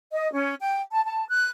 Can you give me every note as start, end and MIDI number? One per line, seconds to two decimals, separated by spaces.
0.12 0.30 75
0.33 0.54 61
0.60 0.80 79
0.92 1.04 81
1.04 1.25 81
1.29 1.48 90